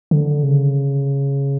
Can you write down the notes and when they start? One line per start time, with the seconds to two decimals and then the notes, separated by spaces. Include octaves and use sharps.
0.11 D3
0.43 C#3